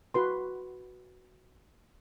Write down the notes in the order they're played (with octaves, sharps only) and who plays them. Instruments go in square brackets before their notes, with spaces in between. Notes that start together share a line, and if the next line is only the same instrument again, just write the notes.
[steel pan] F#4 B4 C6